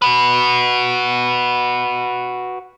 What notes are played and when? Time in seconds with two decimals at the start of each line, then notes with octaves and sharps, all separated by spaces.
0.02 F#4 B4